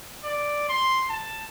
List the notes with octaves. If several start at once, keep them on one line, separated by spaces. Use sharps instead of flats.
D5
C6
A5